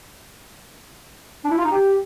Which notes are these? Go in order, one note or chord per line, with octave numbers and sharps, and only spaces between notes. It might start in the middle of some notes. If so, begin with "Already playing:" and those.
D4
E4
F4
D#4
G4